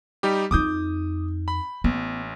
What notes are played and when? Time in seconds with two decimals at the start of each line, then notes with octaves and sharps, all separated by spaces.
0.23 G3 D#4 G4
0.51 F2 D#4 D6 D#6 G6
1.48 B5
1.84 A1 B3